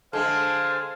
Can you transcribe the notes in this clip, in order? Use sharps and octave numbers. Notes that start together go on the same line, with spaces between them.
D3 G#3 A4 C5 F5 G#5